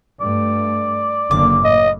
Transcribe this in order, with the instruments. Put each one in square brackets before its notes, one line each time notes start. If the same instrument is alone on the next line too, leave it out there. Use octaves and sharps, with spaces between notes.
[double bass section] G2 A3 [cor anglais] D5
[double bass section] F#1 D3 A#3 [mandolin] D6
[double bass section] A2 [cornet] D#5